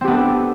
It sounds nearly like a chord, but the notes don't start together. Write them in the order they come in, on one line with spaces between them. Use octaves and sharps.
C4 G4 B3 D4 A4